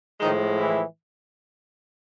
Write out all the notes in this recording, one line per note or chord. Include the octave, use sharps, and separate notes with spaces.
A2 D#3 F3 G#3 D#4
E3 E4